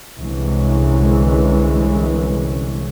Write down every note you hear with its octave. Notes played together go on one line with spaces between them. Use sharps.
C2 D3 E3 G#3 C#4